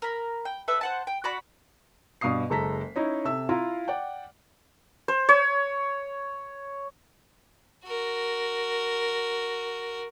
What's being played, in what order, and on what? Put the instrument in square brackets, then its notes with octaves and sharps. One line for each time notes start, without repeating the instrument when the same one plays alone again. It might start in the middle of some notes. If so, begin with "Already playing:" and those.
[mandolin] A#4 B5
G5
A4 B4 E5
C5 F#5 A5
G5
F#4 D5 F#5 B5
[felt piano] G2 B2 F5 D#6 C7
F#1 G#3 A4 A#5 B6
C#4 D#4 E4
C3 A4 E5 E6
E4 F4 F5 A#5 C6
D5 F#5 G5
[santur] C5
C#5
[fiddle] F#4 A#4